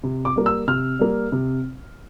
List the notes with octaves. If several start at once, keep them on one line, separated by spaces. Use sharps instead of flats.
C3
D6
G3 A#3
E6
C3 F6
G3 A#3
C3